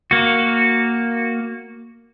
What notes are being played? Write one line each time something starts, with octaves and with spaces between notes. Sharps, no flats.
A#3 F#4